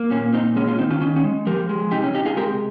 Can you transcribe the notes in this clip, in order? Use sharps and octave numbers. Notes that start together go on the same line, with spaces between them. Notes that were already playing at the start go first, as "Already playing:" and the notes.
Already playing: A#3
A#2 C#4
A#2 C4 D#4
G#3 C#4
C#4 F4
D#3 C4 D#4
C#4 F4
D#3 C#4
C#4
G#3
F3 G4 A#4
G#3
C3 D#4 G4
C#4
C3 D#4 G4
F4 G#4
G#3 G4 A#4